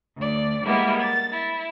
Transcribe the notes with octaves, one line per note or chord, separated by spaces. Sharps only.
D2 D5
G3 G#3 A#3 B3 E4
A6
E4